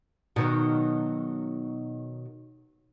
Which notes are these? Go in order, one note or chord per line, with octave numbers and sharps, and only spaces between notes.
B2 D#3 F#3